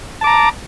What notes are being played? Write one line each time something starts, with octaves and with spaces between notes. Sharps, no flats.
A5 A#5 D6